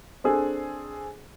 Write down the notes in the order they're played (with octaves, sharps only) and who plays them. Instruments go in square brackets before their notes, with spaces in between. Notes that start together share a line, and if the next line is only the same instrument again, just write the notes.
[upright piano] C4 D4 G#4 A4